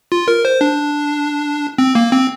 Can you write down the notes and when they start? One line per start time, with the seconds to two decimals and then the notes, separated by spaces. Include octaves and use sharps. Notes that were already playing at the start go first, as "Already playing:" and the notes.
0.12 F4
0.28 A#4
0.45 C5
0.61 D4
1.78 C4
1.95 A#3
2.12 C4